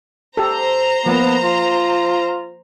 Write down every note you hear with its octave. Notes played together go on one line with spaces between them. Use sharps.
G4 A4 C5 A#5
F3 A#3 B3
F4